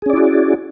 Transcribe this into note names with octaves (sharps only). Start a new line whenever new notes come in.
C#4 E4 F#4 G#4 D5